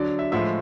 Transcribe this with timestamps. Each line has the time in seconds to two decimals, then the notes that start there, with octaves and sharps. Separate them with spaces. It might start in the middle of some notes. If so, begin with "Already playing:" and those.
Already playing: D3 F#3 D5
0.19 E5
0.32 A2 F3 G#3 E5